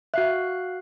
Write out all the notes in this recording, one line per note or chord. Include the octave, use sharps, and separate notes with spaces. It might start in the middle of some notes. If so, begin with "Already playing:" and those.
F#4 E5 F5 F#6